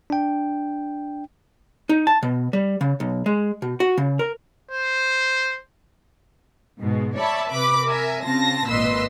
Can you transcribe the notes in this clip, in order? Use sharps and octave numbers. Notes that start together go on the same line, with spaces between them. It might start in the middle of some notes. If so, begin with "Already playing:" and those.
D4 G5
D#4
A5
B2
G3
C#3
B1
G#3
B2
F#4
C#3
A#4
C5
G#2 B2 G#3
C#5 D5 E5 A5 B5
C3 B4 B5 D6
A#4 E5 G#5
C#3 C4 F4 A5 A#6
G#1 A#2 B4 D#5 C6 E6